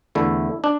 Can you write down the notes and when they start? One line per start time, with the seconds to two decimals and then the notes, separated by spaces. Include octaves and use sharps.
0.15 E2 D3 A3 E4
0.64 D4